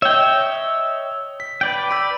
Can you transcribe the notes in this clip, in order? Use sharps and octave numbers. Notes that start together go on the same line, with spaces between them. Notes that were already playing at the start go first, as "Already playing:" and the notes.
C#5 D#5 E5 G5
B6
B4 D5 G5
B5 E6